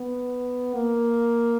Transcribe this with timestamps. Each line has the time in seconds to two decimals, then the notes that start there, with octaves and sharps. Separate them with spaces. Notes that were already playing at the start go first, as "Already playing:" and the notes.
Already playing: B3
0.75 A#3